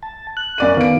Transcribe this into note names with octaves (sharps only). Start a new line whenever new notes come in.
A5
F#6
F#2 D5 D#7
D#3 B3 F5 D7